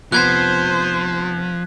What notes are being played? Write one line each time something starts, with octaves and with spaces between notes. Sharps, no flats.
F1 F3 B3 C5 F#6 G#6 B6